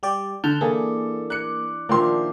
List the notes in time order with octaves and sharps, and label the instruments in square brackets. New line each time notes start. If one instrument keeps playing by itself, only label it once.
[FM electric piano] G3 G4 D5
[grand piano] D3 [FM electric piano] A5 F6 G6
[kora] E3 G#4 [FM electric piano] A#3 [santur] D4 [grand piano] A4
[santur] D5 [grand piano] F#6 C#7
[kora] A#2 D#3 A#3 [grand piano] F3 C6 [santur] D4 C5 E5